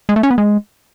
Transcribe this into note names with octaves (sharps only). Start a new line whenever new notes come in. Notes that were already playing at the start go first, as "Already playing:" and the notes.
G#3
A3
C#4
B3
G#3